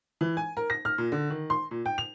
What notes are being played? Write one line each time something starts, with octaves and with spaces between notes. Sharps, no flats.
E3
G#5
A#4
A#6
F6
A#2
D3
D#3
C6
A#2
G5
F7